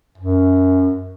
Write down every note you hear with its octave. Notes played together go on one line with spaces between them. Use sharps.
F#2